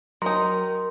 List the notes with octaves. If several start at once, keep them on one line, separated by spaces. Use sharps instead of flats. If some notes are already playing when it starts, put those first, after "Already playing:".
D#3 F#3 D#4 F#4 A#4 C6